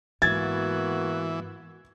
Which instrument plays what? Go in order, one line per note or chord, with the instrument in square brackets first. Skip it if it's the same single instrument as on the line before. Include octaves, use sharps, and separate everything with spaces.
[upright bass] G#2 [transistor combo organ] E3 [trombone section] A#3 B3 F#4 [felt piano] G#6 A6